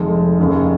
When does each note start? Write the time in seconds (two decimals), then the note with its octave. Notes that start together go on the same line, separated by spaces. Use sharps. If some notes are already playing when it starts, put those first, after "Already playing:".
Already playing: F1 F2 D#3 G#3
0.39 F1 D#2 C#3